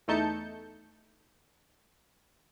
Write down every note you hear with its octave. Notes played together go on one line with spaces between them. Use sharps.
E2 A3 D#4 A5 G6 C#7